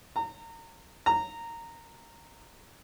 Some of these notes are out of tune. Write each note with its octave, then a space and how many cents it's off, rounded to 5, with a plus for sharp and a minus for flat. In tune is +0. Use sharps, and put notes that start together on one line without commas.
A#5 -30
A#5 -15